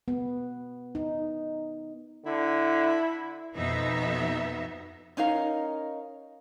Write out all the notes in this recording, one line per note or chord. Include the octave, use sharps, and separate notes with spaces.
B3
D#4
D3 E4
F2 B2 B3 D#4 E5
C#4 D#4 A#4 F5